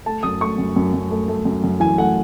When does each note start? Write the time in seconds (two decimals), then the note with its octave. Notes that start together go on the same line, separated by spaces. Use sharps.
0.06 A3 A5
0.23 F#2 D#6
0.41 A3 C#6
0.58 F#2
0.76 F#2
0.94 F#2
1.11 A3
1.28 A3
1.45 F#2
1.64 F#2
1.80 E3 G#5
1.98 A3 F#5